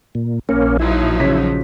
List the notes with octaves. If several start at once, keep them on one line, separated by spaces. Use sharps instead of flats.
A#2
A#1 A#3 C#4
F3 F#3 D#4 E4
C#3 C#5 B6